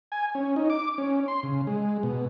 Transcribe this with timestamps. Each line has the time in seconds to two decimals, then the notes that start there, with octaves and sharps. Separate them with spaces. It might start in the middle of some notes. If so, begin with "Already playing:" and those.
0.12 G#5
0.35 C#4
0.56 D#4
0.70 D6
0.98 C#4
1.28 C6
1.43 C#3
1.67 G#3
2.03 B2